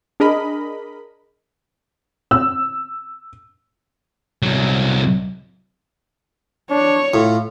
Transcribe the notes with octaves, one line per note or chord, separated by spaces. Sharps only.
D4 G#4 A#4 D#5 B5
E6
C2 F#3
D4 C#5
A2 F4